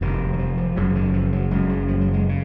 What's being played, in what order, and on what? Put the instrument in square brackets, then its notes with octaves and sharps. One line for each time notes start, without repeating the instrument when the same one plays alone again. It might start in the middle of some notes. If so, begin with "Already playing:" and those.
[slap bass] F1 F2 C3 D#3
F#3
F3
F3
F3
F#1 F#2 C#3 F#3
D#3
F3
F#3
F#1 F#2 C#3 G#3
F#3
F3
F#3
G#3
C#3